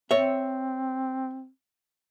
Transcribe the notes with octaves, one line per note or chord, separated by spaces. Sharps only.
C4 C#5 E5